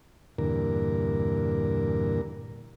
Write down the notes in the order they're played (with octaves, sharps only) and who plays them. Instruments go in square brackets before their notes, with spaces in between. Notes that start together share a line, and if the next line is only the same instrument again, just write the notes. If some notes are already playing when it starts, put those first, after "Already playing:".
[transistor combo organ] E2 G2 A#2 D3 A#4